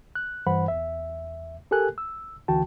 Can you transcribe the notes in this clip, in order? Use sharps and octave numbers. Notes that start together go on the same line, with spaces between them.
F#6
G2 E3 C5 F#5 B5
E2 E5
G4 A4 A#4 G#5 F#6
E6
D2 D3 E3 F#4 G5 A5